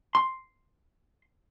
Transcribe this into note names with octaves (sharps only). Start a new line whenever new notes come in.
C6